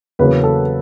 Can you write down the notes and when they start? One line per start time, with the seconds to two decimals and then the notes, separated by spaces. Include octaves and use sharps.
0.19 E2 C#3 F#3 A#3 B4
0.44 A4